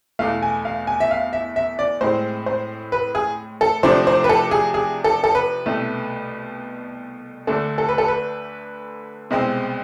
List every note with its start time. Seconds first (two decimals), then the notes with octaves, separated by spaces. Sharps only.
0.19 E2 B2 A3 F5
0.42 G#5
0.65 F5
0.87 G#5
1.00 E5
1.11 F5
1.33 E5
1.56 E5
1.79 D5
2.01 A2 G#3 C4 C5
2.46 C5
2.92 B4
3.15 G#4
3.61 A4
3.83 C3 F3 A3 D4 C5
4.07 C5
4.24 B4
4.29 A4
4.51 G#4
4.74 G#4
5.04 A4
5.24 A4
5.35 B4
5.66 C2 B2 A3
7.47 D2 D3 A3 D4 A4
7.78 A4
7.89 B4
7.98 A4
8.08 B4
9.31 C2 B2 G#3 C4